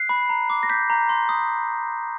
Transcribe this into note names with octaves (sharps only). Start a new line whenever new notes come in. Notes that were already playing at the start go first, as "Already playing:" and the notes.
Already playing: F#6 C7
B5
A#5
D6
A#6
G6 B6
A#5
C6
D#6